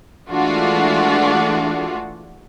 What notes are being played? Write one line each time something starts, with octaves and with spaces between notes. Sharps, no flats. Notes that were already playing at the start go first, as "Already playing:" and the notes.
E3 G#3 A3 D4 F4 F#4